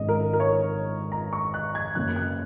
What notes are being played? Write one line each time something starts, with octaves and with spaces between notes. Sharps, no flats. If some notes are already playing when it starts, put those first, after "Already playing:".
Already playing: G#1 G#2 G#3 C#4 D#5
A#4
A#4
C#5
A#5
C#6
F#6
G#6
F#2 C#3 A#3 F#6
F#6